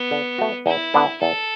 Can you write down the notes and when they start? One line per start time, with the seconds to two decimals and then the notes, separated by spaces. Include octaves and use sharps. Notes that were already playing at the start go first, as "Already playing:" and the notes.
Already playing: B3
0.11 D3
0.38 A3 F#4
0.66 E2 E4
0.94 D3 B3 D4 B4
1.21 E2 A4